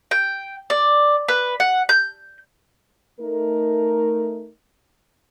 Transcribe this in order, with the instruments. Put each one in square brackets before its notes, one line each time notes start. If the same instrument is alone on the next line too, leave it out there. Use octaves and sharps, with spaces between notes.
[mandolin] G5
D5
B4
F#5
G6
[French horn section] A3 D#4 A#4